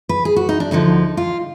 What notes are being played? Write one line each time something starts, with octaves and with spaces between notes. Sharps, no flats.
B4
G#4
F#4
D#4
D4
D2 D3 F3 D#4
F4